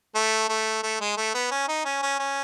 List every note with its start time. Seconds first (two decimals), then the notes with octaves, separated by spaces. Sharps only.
0.15 A3
0.49 A3
0.83 A3
1.00 G#3
1.17 A3
1.34 B3
1.51 C#4
1.68 D#4
1.85 C#4
2.03 C#4
2.19 C#4